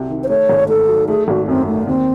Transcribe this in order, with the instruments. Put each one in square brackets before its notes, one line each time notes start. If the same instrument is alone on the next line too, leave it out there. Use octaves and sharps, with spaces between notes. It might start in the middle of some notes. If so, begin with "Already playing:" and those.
Already playing: [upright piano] C2 C3 F#3
D#3
[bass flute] C5
[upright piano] A3 [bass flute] C#5
[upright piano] G#1
[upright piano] G#2 [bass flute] A4
[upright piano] F#3
[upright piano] A3 [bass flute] G#4
[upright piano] G#1 [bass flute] F#4
[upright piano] F#2 [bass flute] C4
[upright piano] D#3 [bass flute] A3
[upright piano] D#2 [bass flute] C4